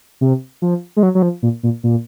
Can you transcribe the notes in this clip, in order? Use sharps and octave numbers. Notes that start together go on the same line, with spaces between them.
C3
F3
G#3
F#3
F#3
F3
A#2
A#2
A#2